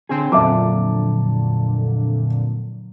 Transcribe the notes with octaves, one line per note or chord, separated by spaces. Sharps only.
D3 C4 G#4
F2 A#2 D3 F#3 E5 A5 D6